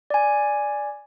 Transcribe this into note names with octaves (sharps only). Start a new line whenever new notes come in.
D5 G#5